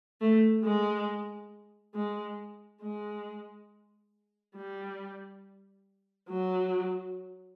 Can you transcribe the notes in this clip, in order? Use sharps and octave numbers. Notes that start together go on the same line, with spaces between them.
A3
G#3
G#3
G#3
G3
F#3